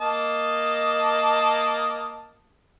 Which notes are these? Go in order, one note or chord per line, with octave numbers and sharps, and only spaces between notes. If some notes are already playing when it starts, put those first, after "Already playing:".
A#3 D#5 A5